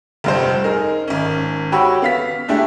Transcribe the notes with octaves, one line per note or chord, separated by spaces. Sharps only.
F1 G2 C5
D#4 G#4 A#4
G#1 C#4
F#4 G4 C#5 G5 B5 E6
B3 F5 B6
G#3 A3 D4 E4 G4